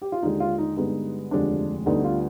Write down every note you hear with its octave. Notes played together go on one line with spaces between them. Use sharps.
G4
F4
D#2 D3 G#3 D#4
F4
D#4
G2 D3 G#3 B3 D#4
F1 D#2 D3 F3 G#3 D4
D2 D3 G3 B3 D#4
F4